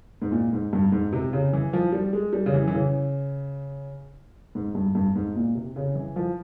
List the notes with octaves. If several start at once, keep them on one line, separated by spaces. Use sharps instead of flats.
G#2
A#2
G#2
G2
G#2
C3
C#3
E3
F3
G3
G#3
G3
C#3
E3
E3
C#3
G#2
G2
G2
G#2
A#2
C3
C#3
E3
F3